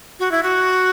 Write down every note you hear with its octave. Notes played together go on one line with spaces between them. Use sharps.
F#4
E4
F#4